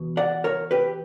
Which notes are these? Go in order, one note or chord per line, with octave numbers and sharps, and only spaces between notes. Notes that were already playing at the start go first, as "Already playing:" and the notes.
Already playing: E2 B2
D5 F#5
A#4 C#5
G4 B4